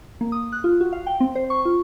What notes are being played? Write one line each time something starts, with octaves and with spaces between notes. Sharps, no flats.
A#3
D#6
F#6
F4
F#4
F5
G5
C4
C5
C#6
F4